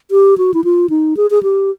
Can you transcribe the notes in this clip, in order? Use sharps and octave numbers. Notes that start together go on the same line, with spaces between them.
G4
F#4
E4
F4
D#4
G#4
G#4
G4